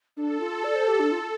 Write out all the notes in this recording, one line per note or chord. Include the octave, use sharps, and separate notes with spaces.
D4 A4
F4
D5
C5
G4
D4
F4